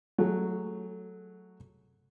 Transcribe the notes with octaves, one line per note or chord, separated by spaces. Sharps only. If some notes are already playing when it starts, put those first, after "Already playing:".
F#3 A3 G#4